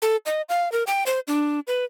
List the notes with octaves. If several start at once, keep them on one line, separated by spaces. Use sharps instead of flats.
A4
D#5
F5
A#4
G5
C5
D4
B4